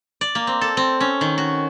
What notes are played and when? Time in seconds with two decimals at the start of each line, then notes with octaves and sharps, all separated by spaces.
0.21 D5
0.35 A#3
0.47 C4
0.61 A4
0.77 C4
1.00 C#4
1.21 D#3
1.38 F#4